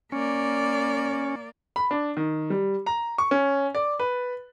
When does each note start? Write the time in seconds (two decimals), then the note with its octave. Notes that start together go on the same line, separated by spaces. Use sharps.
0.12 A#3 C#4 D5
1.76 B5
1.91 D4
2.17 D#3
2.50 G3
2.86 A#5
3.18 C#6
3.31 C#4
3.75 D5
4.00 B4